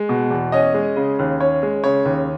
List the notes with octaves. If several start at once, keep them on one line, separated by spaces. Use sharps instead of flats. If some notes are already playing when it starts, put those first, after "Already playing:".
Already playing: G#3
B2
E2
C#4 D#5
G#3
C#3
D#2
C#4 C#5
G#3
C#3 C#5
D#2